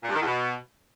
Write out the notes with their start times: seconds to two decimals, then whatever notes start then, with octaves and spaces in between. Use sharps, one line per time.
0.03 A#2
0.09 G2
0.14 D#3
0.20 E2
0.26 B2